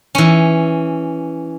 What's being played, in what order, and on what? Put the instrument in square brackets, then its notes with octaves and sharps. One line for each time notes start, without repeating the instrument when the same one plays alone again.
[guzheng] E3 C#4